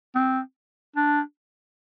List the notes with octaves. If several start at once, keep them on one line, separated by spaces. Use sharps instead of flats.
C4
D4